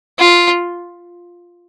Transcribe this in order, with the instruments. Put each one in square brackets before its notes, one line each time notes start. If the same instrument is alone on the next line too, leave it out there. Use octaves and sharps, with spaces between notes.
[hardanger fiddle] F4